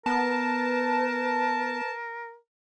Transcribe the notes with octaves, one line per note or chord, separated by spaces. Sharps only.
B3 A#4 B4 A5